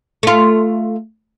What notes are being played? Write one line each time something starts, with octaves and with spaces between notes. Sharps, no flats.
A3 F4